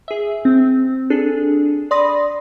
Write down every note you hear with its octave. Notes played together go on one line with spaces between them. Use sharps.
G#4 E5
C4
D4 G#4 A4
D5 B5 C6 D#6 A#6